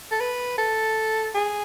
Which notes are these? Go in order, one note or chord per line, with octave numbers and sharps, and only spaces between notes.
A4
B4
A4
G#4